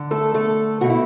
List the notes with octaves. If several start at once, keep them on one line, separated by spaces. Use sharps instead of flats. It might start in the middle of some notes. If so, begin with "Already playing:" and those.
Already playing: D3
A3 A4
A3 A4
B2 A3 F#4
E4